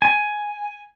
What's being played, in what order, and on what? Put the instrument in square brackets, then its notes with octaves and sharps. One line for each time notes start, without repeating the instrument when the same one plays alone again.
[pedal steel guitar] G#5